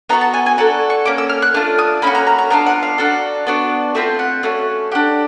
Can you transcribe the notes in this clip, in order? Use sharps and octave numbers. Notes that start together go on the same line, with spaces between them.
B3 D#4 F#4 A4 A#5
A5
G#5
G#5
D4 F#4 A4 A#5
C#6
A#3 C#4 D6
E6
F6
F#6
A3 D4 F4 F6
D#6
A#3 C#4 F#4 B5
A#5
A#5
A#5
B3 D4 F4 A#5
F#5
F5
D4 F#4 A4
B3 D4 F#4
A3 C4 F4 E5
F#5
A3 C#4 F#4
D4 G4 F#5